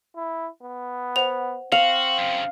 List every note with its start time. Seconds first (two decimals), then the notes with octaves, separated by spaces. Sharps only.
0.16 E4
0.63 B3
1.16 C5 F#5 F7
1.72 C4 F#4 F5 F7
2.18 F#2 C#3